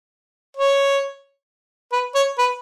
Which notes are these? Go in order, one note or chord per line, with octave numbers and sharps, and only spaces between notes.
C#5
B4
C#5
B4